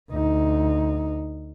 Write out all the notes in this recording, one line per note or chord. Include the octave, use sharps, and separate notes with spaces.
D2 D#4